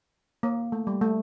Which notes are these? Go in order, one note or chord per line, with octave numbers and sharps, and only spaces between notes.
A#3
A3
G3
A3